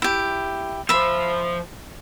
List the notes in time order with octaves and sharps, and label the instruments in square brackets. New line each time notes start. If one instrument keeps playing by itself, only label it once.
[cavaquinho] E4 G4
[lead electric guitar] F3 C5 [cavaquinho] E5 B5